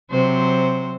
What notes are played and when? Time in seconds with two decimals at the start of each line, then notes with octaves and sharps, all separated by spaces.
0.11 C3 F#3 C5